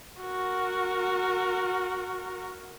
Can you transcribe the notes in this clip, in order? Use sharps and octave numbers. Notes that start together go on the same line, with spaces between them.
F#4 A#4